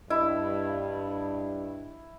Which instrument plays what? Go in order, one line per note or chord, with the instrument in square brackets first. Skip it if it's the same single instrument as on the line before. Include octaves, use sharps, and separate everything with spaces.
[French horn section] G2 [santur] E4 [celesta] D#5